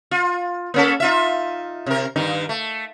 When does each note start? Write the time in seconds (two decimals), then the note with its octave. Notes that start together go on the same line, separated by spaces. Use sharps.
0.11 F4
0.74 A#3 C#4 A4
1.00 D#4 F4 E5
1.86 C3 A#4
2.16 G2 D#3 D#4
2.49 A3